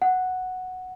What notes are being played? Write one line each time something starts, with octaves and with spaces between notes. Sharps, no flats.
F#5